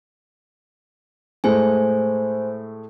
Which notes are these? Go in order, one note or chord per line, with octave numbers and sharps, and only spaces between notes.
A2 G#3 A3 C5 G#5